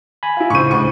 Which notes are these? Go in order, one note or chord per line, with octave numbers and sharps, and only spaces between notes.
G#5 B5
E4 F4
A2 C#3 C5 C#6 D#7
D2 C#6